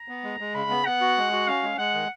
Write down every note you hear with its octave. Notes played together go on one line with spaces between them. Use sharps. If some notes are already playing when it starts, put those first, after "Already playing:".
Already playing: A#5
B3
G#3
G#3
C#3 B5
B3
B3 F#5
F#4
G#3
F#4
C#4 F5
G#3
G#3 F#5
D#3